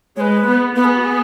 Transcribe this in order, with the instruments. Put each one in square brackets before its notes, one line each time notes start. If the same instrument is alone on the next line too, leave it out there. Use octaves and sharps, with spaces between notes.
[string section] G#3 [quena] B4 C#5
[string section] B3
[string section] B3 [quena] B4
[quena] G#4
F#4
G#4